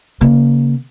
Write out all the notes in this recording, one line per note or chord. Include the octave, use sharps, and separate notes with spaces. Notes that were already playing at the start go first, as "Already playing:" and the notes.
C#3 A#3